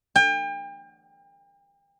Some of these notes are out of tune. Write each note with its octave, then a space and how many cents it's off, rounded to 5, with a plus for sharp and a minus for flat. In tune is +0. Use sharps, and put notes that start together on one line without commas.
G5 +35